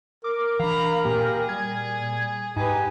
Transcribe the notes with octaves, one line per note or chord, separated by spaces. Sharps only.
A#4 D6
E3 D4 F5 A#5 B5
A#2 A#3 G4 G#4
G3 G#6
G#2 D#4 G4 B4 G#5